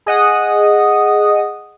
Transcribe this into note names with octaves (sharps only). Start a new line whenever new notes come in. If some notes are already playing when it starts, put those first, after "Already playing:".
G#4 D#5 F#5 D#6